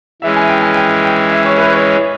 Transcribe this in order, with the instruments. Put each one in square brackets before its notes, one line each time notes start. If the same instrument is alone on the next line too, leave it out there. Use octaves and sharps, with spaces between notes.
[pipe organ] E3 G#3 C#4 [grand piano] E5
[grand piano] G#5
G5
G#5
G5
G5
E5
C#5
B4
C#5